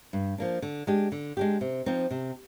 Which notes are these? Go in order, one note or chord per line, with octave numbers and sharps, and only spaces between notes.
G2
F3 A#3 D4
D3
G#3 D4 G4
D3
G#3 D4 G4
C3
F3 C4 D#4
C3